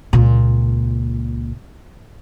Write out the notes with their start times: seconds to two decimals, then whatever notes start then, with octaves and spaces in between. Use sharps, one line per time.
0.13 C#2 A#2